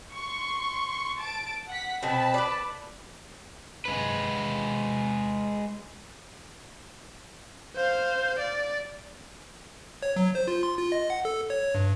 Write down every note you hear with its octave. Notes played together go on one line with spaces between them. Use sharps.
C6 C#6
A5 A6 D7
F#5 B6
B2 C4 A5 B5
B4 D5
G#3 B4
C5 F5
D5
C#5
F#3
C5
F4
C6
F4
D#5
F#5
A4
C#5
G2